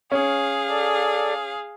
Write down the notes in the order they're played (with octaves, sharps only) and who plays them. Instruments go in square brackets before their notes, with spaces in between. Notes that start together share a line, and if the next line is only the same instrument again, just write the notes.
[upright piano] C#4 [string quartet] G#4 F5
[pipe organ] A4 D5